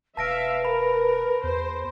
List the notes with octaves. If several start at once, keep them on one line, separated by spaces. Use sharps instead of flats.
E1 B4 E5 F5 A5 A#6 D7
A#4 B5
E2 C5